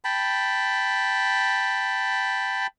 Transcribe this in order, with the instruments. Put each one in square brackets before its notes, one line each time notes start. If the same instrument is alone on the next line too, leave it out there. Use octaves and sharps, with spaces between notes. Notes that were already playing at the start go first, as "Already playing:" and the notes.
[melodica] G5 A5 B5